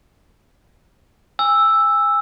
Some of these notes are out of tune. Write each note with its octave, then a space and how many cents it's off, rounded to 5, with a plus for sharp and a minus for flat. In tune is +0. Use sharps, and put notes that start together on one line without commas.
G#5 -25 E6 +0